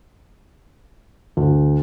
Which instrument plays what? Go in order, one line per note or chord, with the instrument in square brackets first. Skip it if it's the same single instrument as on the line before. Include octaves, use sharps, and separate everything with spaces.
[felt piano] D2